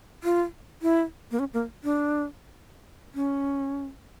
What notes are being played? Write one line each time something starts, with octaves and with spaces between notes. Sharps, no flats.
F4
E4
A#3
C#4
A#3
D4
C#4